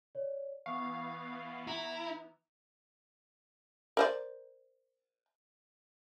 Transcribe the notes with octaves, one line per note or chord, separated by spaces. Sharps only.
C#5 D5
E3 B3 F5 C#6
E4 A#5
A#4 C5 D5